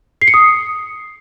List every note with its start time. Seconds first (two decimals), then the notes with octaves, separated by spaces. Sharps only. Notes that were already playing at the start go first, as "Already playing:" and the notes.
0.22 C7
0.28 C#7
0.34 D#6